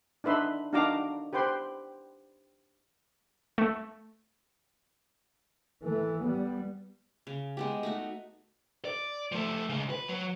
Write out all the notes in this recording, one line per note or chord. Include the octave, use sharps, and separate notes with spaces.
D4 D#4 B4 E5 C6
D4 D#4 F#4 F5 A#5 D6
G4 B4 C5 G5 C6
A3
E3 A3
G3 B3
C#3
G#3 B3 G4
A3 D#4 F#4
D5
F3 A3
C#3 G#3
B4
F#3